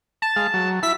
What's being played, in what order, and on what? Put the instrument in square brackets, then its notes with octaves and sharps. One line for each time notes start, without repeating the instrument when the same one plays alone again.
[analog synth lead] A5
[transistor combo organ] G#3 F5
F#3
[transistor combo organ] E4 E5 [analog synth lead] B6